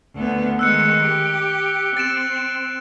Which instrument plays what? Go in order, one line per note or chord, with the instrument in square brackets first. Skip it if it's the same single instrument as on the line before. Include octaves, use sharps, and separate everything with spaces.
[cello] D2 B3
[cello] D#3 G#3 [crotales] E6 F#6 C#7
[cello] G4
[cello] C4 [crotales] A6 D7 E7